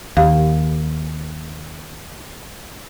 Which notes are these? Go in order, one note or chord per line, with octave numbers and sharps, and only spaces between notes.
D#2 G4 F5